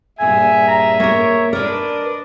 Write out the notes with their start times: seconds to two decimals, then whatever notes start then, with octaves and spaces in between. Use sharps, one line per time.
0.19 G2 A#2 G#4 E5 G#5
0.68 A#5
1.00 A#3 A#4 C#5
1.53 D4 A#4 B4 D5 D#5